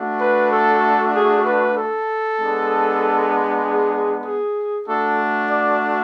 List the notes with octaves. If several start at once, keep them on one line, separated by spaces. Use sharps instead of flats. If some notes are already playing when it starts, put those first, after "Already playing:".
Already playing: A3 D4 F#4
B4
A4
G#4
B4
A4
G#3 B3 D4
G#4
G#4
A3 D4 F#4 A4
D5